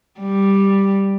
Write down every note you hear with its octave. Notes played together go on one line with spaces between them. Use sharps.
G3